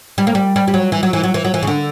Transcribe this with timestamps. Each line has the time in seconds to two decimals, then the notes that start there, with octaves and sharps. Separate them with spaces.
0.18 G3
0.27 A#3
0.35 G3
0.56 G3
0.68 G3
0.74 F#3
0.92 E3
1.03 F#3
1.13 E3
1.23 F#3
1.34 E3
1.45 F#3
1.54 E3
1.63 C#3
1.67 D3